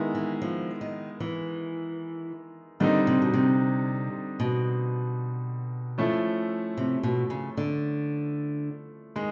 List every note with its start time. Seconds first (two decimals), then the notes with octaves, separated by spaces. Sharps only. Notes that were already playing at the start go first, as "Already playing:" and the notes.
Already playing: D#3 G#3 B3 E4
0.15 E3
0.42 F3
0.81 D#3
1.20 E3
2.80 D3 D#3 G3 C4 D#4
3.07 C3
3.22 B2
3.34 C3
4.40 B2
5.98 F3 A3 C#4 E4
6.78 C3
7.03 B2
7.30 C#3
7.57 D3
9.16 D#3 G#3